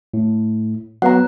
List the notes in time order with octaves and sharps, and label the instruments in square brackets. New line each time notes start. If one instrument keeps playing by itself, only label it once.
[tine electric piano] A2
[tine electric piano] F#3 B3 [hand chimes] F#5 A#5